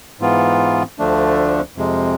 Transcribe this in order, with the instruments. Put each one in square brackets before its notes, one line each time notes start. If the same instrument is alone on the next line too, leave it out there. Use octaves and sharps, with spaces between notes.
[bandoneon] G#2 E3 B3 F4
D2 D3 F3 A3 D4
F2 C3 G#3